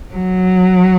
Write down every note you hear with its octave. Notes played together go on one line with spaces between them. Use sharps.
F#3